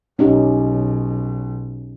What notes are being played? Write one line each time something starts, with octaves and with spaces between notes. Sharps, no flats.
B1 C#4 D#4 G4